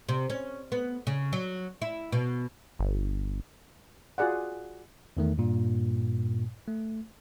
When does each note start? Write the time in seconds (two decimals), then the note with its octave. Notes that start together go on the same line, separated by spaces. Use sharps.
0.09 C3
0.30 C#4
0.72 B3
1.07 C#3
1.33 F#3
1.82 E4
2.12 B2
2.79 G1
4.18 F4 F#4 G#4 D5 F#5
5.17 E2 D#3 A3
5.38 G2 A#2
6.68 A3